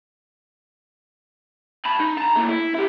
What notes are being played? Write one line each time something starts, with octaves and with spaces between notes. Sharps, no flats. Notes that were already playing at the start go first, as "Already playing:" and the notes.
A5 B5
D#4
A5 A#5
A#3 E4
E4
E4 G4